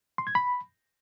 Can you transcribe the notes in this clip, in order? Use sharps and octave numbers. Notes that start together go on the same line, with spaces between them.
C6
G#6
B5